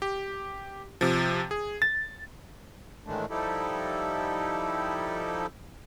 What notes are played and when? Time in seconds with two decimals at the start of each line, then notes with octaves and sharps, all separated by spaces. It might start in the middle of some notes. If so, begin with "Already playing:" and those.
0.02 G4
1.01 C3 F3
1.51 G#4
1.82 A6
3.06 A2 D#3 E3 G#3 A3 D4
3.30 F3 G3 D#4 E4 G4 A4